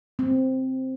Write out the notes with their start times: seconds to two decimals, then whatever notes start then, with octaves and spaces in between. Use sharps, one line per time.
0.19 C4